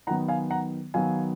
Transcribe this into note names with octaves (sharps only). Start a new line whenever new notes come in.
D#3 F#3 B3 F#5 A#5
F5 G#5
F#5 A#5
D#3 F#3 B3 F5 G#5